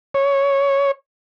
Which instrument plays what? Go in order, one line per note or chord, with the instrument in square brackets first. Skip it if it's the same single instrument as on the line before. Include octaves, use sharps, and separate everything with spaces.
[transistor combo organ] C#5